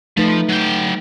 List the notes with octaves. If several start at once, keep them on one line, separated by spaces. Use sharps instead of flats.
F3 A3 D#4 B4
F#3 G5